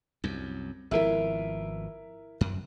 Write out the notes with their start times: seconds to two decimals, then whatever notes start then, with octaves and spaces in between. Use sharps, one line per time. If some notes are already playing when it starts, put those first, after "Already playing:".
0.24 C2 F#2
0.91 G#1 B2 F3 E4 A#4 E5
2.41 F#2